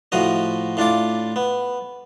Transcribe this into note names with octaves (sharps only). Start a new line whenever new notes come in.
A2 F3 F#4 D#5
A2 D4 F4 D6
B3